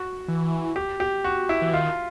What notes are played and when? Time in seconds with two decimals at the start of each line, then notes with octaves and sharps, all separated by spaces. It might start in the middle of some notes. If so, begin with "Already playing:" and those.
Already playing: F#4
0.28 E3
0.76 G4
1.00 G4
1.24 F#4
1.49 E4
1.62 E3
1.73 D#3 F4